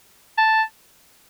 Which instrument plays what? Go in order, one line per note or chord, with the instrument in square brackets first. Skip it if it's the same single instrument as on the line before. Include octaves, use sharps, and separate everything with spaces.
[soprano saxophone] A5